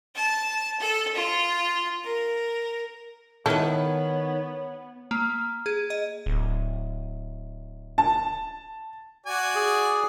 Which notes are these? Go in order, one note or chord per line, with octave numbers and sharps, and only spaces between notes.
A5
A4
F4
A#4
D#3 B3 D#4 E4 A4 B4 C#5
A#3
G#4
D#5
D1
A5
F#4 D5 G#5
G#4